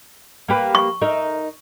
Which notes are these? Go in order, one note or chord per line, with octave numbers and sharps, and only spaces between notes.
A#3 G4 B4
C#6
D#4 A#4 E5